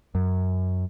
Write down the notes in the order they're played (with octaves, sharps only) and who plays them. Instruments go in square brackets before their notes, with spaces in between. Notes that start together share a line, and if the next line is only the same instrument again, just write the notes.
[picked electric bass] F#2